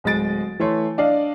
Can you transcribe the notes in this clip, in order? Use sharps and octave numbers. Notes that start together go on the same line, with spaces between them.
D1 G#3 D#5 A6 D7
E3 A3 C#5 C6
D4 D5 D#5 F5